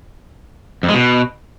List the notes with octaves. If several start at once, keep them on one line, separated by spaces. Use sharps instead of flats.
F2
G#3
B2